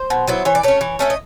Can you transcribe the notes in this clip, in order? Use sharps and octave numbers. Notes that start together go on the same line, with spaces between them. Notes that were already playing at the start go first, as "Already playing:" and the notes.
Already playing: C5
B2
F#3 B3 E4
E3 C#5
D5
A3 C#4 C#5
E3
A3 C#4 E5
D#5